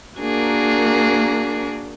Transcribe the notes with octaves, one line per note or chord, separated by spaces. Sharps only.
A#3 D4 F#4 G#4 A#4